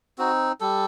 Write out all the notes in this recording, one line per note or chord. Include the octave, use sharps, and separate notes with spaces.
C4 D#4 F#4
G3 A4